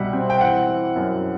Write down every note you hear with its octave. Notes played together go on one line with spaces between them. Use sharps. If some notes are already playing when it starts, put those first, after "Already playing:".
Already playing: C2 B2 G3 E5 F#5
C4
G5
E3 F#5
E3
F#2